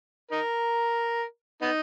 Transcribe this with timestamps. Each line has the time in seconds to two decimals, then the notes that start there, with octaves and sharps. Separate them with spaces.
0.31 D#4 A#4
1.62 B3 D#4